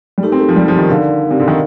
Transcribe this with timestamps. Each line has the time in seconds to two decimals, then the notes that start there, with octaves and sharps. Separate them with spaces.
0.18 G3
0.23 A3 D#4 G4 A#4
0.32 C4
0.40 A3
0.49 F3
0.56 G3
0.68 F3
0.79 D#3
0.89 D3 D#4 A#4 D5 F5
1.31 C3
1.40 D3
1.48 D#3